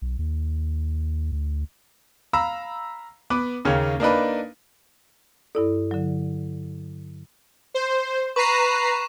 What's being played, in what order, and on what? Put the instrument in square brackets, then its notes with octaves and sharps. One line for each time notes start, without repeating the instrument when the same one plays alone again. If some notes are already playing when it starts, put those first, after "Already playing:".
[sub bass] B1
D#2
D2
[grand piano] F5 A#5 B5 E6
B3 B4 D6
D#2 C#3 A#3 C#4
A#3 D4 D#4 B4
[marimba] G2 E4 D5 [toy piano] A4
[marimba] D3 F#3
[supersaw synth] C5
[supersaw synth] B4 A#5 C7 [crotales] C#6 D#7